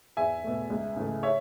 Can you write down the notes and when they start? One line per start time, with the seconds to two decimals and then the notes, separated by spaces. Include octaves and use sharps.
0.17 E2 E5 G#5
0.44 B2 A3
0.70 C#2
0.96 C#3 E3 A3
1.23 C#5 E5